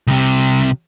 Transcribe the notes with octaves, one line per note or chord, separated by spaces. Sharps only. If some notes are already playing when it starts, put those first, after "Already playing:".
C2 C3